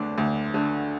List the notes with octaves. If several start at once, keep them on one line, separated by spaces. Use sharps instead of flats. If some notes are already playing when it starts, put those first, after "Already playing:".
Already playing: D2 D3 A3 D4 D5
D2
D3 A3